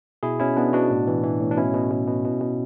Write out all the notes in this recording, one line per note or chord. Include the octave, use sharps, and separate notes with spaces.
B2 E4 G#4
B2 C#4 E4
B2 B3 D4
B2 D4 F#4
A2
E3
E3
A2
D4
B2 C#4 E4
B2
B2
B2
B2
B2